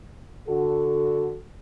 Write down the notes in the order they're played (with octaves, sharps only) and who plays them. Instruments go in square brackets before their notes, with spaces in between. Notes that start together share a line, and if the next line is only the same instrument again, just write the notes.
[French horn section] D3 F#4 A4